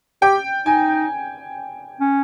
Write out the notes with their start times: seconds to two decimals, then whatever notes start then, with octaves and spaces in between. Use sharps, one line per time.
0.22 G4 G5
0.66 D#4 G#5
2.00 C#4